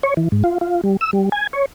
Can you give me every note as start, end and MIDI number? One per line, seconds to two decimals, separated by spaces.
0.03 0.14 73
0.17 0.28 52
0.32 0.43 44
0.44 0.58 65
0.61 0.81 65
0.84 0.97 55
1.01 1.11 88
1.13 1.29 55
1.32 1.47 80
1.53 1.66 73